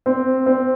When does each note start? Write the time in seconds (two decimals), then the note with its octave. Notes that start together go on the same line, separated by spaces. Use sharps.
0.06 C4
0.46 C4